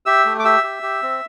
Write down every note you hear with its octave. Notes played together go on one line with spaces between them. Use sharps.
G4 E5 E6
A3
D6
G4 E5 E6
G4
G4
C4